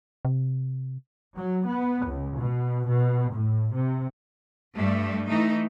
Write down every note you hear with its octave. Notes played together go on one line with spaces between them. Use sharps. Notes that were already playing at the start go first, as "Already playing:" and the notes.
C3
F#3
B3
C#2
B2
B2
A2
C3
G2 G3 A3
E3 A3 D#4